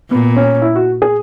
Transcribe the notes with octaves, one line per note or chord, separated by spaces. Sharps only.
A#2 B3
C#4
E4
F#4
G#4